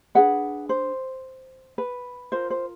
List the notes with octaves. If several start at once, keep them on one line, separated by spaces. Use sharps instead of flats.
D4 F4 G#4 B4 F#5
C5
B4
F4 A#4 C5
C5